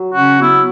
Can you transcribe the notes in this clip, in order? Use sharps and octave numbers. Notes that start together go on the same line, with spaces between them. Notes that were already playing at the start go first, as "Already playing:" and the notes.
Already playing: F#3
C#3 C#4 F#4
F#3 B3 E4